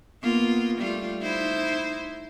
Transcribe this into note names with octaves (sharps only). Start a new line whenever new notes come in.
A#3 B3 F4
G3 A3 F4
D#4 E4 C5